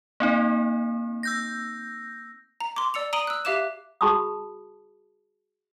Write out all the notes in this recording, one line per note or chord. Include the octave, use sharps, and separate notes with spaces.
A#3 C4 D#4
E6 G6 A#6
A#5
C6 D6
D5 E6 C#7 F7
A#5 D#6 D7 D#7 F#7 G7
E6 F#6
G4 E5 F5 D6 F#6 E7
F#4 G#4 A5 B5 C#6 D#6